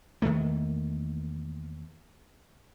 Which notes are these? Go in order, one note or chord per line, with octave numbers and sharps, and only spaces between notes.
E2 D#3 A3 A#3